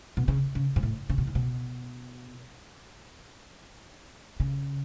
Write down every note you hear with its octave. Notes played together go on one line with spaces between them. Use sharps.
B2
C#3
C#3
G#2
A2
C#3
B2
A2
B2
C#3